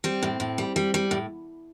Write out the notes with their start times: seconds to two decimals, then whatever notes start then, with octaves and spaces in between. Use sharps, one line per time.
0.04 G3 C4
0.23 A2
0.40 A2
0.58 G3
0.76 G3
0.94 G3
1.11 A2